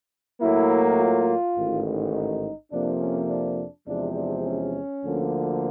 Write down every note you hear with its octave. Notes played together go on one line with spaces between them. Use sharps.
A2 F#3 A#3 E4
F4
A1 G#2 D#3
D#4
F2 C3 F3 A#3 D4
C#4
D4
E2 C3 F3 G#3 D4
D4
C#4
D2 D3 F3 A#3